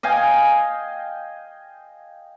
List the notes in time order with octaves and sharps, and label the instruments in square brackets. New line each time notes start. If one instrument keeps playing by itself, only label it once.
[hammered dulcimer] D#5 F5 G5 G#5